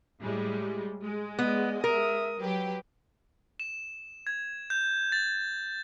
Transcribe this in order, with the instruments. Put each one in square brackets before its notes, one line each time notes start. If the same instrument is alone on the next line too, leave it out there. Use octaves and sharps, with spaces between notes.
[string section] A2 G3 G#3
G#3
[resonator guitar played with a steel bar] B3 [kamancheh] D5 D#5
[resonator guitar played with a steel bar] A#4 [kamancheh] E5 D#6
[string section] F#3 G4 [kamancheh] B4
[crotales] E7
G#6
G6
A6